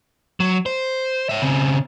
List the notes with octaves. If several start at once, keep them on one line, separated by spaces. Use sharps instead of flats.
F#3
C5
C#5 E5
C#3 C4